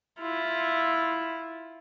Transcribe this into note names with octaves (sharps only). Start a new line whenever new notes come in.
E4 F4